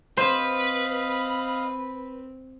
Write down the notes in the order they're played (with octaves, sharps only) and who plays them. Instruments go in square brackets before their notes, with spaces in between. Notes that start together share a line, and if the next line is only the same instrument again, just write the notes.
[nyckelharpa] C4 [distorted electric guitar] B4 [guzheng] C5 [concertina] D#5 F5